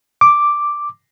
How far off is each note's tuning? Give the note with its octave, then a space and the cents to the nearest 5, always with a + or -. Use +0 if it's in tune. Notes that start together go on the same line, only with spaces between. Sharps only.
D6 +0